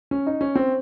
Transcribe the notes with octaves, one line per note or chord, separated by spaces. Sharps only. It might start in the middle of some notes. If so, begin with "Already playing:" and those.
C#4
D#4
C#4
C4